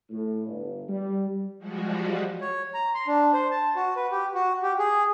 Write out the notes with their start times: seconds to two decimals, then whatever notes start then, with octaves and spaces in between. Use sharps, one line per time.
0.10 A2
0.47 G1
0.88 G3
1.59 F3 G3 G#3 F#4
2.41 C#5
2.74 A#5
2.94 C6
3.07 D4
3.33 C5
3.51 A5
3.76 F#4
3.96 B4
4.11 G4
4.35 F#4
4.63 G4
4.79 G#4